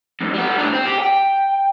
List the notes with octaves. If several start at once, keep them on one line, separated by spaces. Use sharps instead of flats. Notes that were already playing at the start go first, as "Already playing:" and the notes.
F2 G#2
G3 B3
A2 D4
C4
G4
G5